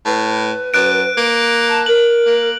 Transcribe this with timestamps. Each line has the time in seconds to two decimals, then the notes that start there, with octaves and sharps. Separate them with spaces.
0.06 A2 B4
0.74 F#2 F#6 D7
1.17 A#3
1.68 A5
1.86 A#4 F#7
2.26 A#3